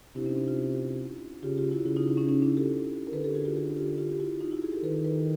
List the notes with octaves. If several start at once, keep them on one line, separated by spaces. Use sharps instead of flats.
C3 D4 E4
C#4 D#4
C4 D4
D#4 F4
C#3 F4 G4
F4 G4
E4 F#4
C#3 E4 F#4
D#4 F4
D4 E4
C#4 D#4
C#4 D#4
D4 E4
G4 A4
A#4
D3 A4 B4
G4 A4
F#4 G#4
F4 G4
F#4 G#4
F4 G4
F4 G4
G4
E4 F#4
D#4 F4
E4 F#4
F#4 G#4
G4 A4
D#3 A4 B4
A4 B4